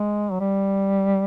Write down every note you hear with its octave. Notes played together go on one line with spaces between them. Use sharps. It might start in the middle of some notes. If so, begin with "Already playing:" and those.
Already playing: G#3
F#3
G3